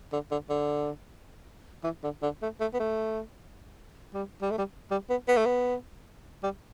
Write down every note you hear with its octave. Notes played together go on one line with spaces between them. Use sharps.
D3
D3
D3
E3
D3
D3
A3
A3
B3
A3
G3
G3
A3
G3
G3
B3
B3
A3
B3
G3